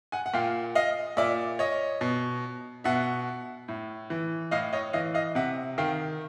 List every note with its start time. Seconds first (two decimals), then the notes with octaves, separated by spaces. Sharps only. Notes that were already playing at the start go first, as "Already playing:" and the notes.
0.12 F#5 G#5
0.26 F#5
0.34 A#2 F5 G5
0.75 D#5 F5
1.17 A#2 D5 E5
1.59 C#5 D#5
2.01 B2
2.84 B2 E5 F#5
3.68 A2
4.10 E3
4.51 A2 D#5 F5
4.73 C#5 D#5
4.93 E3 D#5 F5
5.14 D#5 F5
5.35 C3 E5 F#5
5.78 D#3 F5 G5